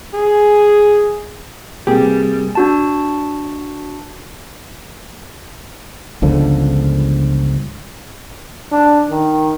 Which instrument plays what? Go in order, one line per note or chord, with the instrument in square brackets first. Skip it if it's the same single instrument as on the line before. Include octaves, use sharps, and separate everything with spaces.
[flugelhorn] G#4
[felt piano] C3 A#3 B4 [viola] G3 [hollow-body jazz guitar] G4 G#4
[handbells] D4 F#4 A5
[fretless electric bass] G1 C#2 D3 F3
[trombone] D4
D#3